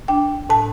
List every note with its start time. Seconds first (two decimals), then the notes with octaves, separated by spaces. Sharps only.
0.08 D4 G5
0.50 A2 A5